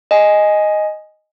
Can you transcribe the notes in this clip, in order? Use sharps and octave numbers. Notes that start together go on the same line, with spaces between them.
D#5 G#5